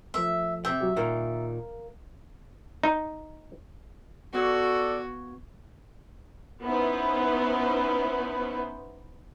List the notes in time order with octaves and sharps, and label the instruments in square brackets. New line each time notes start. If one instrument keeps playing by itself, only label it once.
[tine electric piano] F3 A3 [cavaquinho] E5
[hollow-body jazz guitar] C3 G5 [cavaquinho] E5
[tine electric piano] F#3 F#4 G4
[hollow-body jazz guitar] A#2 D#3 [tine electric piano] A#4 F5
[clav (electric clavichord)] D#4
[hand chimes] B3 C#6 G#6 [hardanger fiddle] F#4 [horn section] A4 D5
[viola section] B3 C#4 D#4 E4 B4 C5